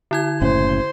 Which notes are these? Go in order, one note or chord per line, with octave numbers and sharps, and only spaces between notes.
D3 E4 G#6
F#1 A2 C#4 C5